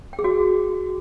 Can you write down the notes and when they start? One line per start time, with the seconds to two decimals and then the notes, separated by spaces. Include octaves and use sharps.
0.13 G5
0.19 G#4
0.24 F#4